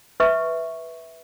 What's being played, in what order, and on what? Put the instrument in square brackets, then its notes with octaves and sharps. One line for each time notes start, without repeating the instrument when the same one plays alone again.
[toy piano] B4 E5 C#6